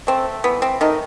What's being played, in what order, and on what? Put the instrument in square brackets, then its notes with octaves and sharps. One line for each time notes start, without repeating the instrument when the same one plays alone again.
[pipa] A3 C4
E3 B3
C4
D#3 A3 D#4